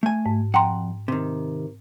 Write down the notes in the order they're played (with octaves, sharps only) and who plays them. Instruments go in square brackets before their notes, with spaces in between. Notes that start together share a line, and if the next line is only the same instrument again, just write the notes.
[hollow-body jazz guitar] A3 G#5
[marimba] G#2
[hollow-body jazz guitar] F2 F#5 [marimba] G5 A#5 C6
[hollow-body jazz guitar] C3 D#3